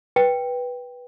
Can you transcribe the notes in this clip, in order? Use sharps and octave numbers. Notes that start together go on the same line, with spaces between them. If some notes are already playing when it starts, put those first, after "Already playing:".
B4 G5